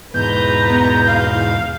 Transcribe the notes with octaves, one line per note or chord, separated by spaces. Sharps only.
E2 G#2 B2 B4 A#5 G6
B3
F5